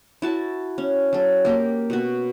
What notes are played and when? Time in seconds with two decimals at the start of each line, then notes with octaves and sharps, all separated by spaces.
0.22 E4 F#4 A5
0.78 C#4
1.13 F#3 A4
1.45 A#3 G4 A#4 G5
1.90 B2 F#4